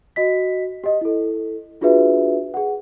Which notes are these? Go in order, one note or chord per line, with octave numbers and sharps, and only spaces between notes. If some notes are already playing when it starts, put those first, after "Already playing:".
F#4 D#5 B6
G4 D#5
E4 A4
D4 F4 F#4 G#4 B4 E5
G#4 F#5